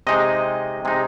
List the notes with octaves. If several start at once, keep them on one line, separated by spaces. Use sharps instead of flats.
C3 G#3 D#4 D#5
C3 G#3 D#4